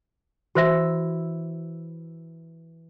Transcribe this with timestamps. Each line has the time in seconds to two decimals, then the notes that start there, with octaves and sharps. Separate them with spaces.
0.55 E3 F#4 C5 E5 E6